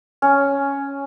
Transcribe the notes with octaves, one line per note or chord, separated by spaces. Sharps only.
C#4